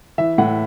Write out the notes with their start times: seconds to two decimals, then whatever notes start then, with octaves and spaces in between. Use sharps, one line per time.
0.18 E3 E5
0.38 A2 F#5